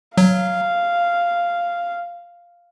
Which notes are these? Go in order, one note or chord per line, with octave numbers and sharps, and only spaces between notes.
F#3 F5